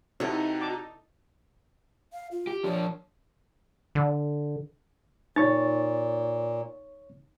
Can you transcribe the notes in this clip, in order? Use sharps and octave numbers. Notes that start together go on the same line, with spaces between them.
C3 D#4 E4 F#4 G4 A4 C#5
A5 D6
F5
F4
G4
F3 D4 C#5
D3
A#2 D#4 C#5 C#6 A6